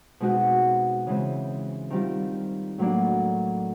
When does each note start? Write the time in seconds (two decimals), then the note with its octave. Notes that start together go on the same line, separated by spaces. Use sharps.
0.20 B2 G#3 C4 D#4 F#4
1.06 C#3 E3 G#3 C4
1.90 D#3 G3 C4 F4
2.78 A2 F#3 A#3 D4